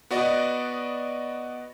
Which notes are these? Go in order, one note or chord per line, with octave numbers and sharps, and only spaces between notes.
B3 F#4 D5 D#5